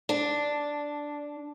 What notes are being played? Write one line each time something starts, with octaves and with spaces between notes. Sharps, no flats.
D4